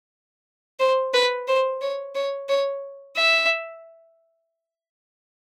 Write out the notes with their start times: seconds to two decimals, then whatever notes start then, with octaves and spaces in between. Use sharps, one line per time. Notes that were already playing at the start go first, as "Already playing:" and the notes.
0.79 C5
1.13 B4
1.47 C5
1.81 C#5
2.15 C#5
2.49 C#5
3.16 E5